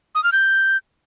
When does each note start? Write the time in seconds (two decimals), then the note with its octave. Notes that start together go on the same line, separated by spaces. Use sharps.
0.15 D#6
0.24 F6
0.33 G6